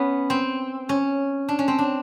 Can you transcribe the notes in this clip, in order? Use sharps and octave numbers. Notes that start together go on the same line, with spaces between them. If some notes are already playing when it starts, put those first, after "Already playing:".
Already playing: B3 C#4
C4
C#4
D4
C#4
C4
D4